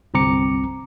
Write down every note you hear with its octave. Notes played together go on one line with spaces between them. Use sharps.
G1 C2 C4 A#5 D6 C#7